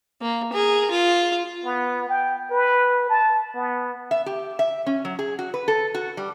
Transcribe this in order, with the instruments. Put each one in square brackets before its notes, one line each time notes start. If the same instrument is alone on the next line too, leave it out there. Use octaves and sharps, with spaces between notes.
[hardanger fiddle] A#3
G#4 A#4
F4
[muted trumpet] B3
G5
B4
A5
B3
[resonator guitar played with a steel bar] E5
G4
E5
C#4
F#3
G#4
F#4
B4
A4
F#4
G3